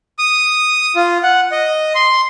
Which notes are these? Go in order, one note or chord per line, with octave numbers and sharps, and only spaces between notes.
D#6
F4
F#5
D#5
C6